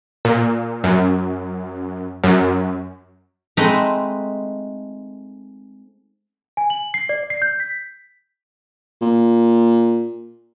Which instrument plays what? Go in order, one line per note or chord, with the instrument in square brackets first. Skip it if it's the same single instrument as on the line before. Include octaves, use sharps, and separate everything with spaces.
[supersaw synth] A#2
F#2
F#2
[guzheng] G#3 A3 C4 D#4 B4 D#5
[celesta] G#5
F#7
C7
D5
C7
G6
B6
[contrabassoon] A#2